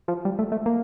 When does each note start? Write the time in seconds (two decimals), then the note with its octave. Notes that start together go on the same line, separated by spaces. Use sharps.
0.08 F3
0.25 G3
0.39 A3
0.52 A3
0.66 A#3